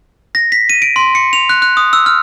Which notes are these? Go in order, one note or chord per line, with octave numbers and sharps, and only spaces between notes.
A#6
B6
D#7
D7
C6
C#7
F7
F#6
F#6
D#6
E6
F6